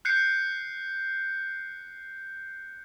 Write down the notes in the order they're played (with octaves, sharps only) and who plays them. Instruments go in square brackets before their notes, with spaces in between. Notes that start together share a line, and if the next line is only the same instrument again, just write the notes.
[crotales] F#6 G6 C7 C#7